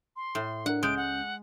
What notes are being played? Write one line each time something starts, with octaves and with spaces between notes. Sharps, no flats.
C6
A2
D4 A#4 F#5
C#2 G#3 C#4 G6 D7
F#5